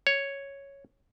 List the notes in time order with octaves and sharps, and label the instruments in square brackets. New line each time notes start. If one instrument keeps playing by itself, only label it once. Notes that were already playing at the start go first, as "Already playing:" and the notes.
[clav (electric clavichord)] C#5